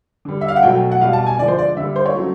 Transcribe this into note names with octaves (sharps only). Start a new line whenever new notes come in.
D3 G3
E5
F5
F#5
B2 F#3 A3 G5
F#5
B2 G3 F5
A5
G#5
D3 F3 G#3 D5
C5
D5
D3 G3 E5
C5
C#5
C#3 F#3 A3